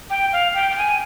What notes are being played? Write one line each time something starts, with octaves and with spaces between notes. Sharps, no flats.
G5
F5
G5
G5
G#5